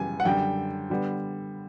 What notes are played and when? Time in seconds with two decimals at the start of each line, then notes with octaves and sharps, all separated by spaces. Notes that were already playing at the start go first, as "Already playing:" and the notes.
Already playing: F#2 C#3 E3 G3 B3 G#5
0.20 F#5
0.25 F#2 D3 G3 G5
0.90 D3 G3 B3